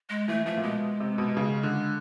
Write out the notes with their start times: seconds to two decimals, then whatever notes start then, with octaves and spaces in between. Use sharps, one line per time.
0.10 G#3
0.28 E3 A3
0.46 F3 A3
0.57 A#2
0.63 B2 G#3
1.00 C3
1.18 B2
1.37 C#3
1.63 D3